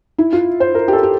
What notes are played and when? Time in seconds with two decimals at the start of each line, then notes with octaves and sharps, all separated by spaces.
0.18 E4
0.33 F4
0.60 C5
0.75 A#4
0.88 G4
0.93 A4
1.03 G4